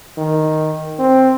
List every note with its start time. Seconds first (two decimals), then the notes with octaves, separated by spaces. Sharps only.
0.17 D#3
0.99 C4